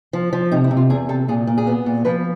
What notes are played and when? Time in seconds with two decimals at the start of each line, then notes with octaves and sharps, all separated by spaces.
0.13 F3
0.33 F3
0.52 C3 D#4
0.64 E4
0.71 C3
0.77 F4
0.90 E2 G#4
1.09 C3 A4
1.28 A#2 G#4
1.47 A#2
1.58 G#4
1.67 B3
1.86 A#2
2.05 F3 B4